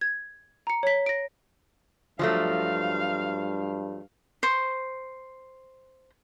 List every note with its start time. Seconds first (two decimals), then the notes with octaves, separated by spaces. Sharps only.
0.01 G#6
0.67 A#5 C#7
0.83 C#5 B6
1.06 A#6 D7
2.19 G2 F3 F#3 A3 F5
4.43 C5 C#6